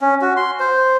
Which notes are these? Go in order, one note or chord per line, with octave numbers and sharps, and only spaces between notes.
C#4
F#4
C6
C5